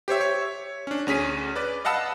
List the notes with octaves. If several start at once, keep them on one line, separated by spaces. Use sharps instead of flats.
G4 C5 C#5 E5
C#5
C#4 D4
D2 C#4 G#4 B6 D#7
B4 D5
D#5 F5 F#5 A5 B5 E6